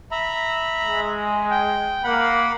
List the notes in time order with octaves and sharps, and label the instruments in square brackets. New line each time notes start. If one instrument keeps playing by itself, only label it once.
[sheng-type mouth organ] E5 A#5 B5
[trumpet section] G#3
[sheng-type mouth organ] G5
[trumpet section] A#3 [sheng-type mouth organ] F#5 B5